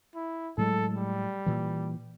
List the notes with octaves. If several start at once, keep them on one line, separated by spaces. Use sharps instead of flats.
E4
A2 F#3 G#3 A4
G3
A#2 E3